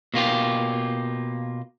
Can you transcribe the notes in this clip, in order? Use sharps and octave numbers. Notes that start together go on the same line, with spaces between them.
B2 A#3 F4 G4